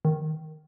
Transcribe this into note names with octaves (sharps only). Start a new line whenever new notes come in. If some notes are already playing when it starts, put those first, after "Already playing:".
D#3